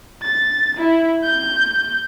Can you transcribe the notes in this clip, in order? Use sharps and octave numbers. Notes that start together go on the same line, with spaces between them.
A6
E4
G6